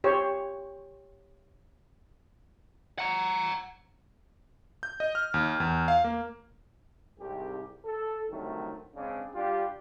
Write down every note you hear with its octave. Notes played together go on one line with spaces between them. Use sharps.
G4 C5 C#5
F#5 A#5
G6
D#5
F6
D#2
E2
F5
A#3
C2 G#2 G4
A4
C2 A2 D3 D#3 F#3 A3
C#3 G#3 C4 D4
G3 D4 F4 G4